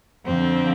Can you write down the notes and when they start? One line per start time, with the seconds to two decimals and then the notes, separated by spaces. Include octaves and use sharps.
0.25 F2 D3 C4